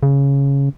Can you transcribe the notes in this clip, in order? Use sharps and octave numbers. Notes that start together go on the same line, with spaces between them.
C#3